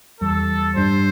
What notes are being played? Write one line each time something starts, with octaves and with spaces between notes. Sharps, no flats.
E2 E3 G3 A4
G2 G3 D4 C5